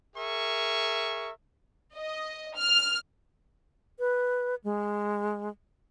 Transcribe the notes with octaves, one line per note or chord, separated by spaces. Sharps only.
G#4 A#4 E5 C#6
D#5
F6
B4
G#3